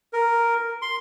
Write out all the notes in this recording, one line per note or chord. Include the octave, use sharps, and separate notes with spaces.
A#4
C6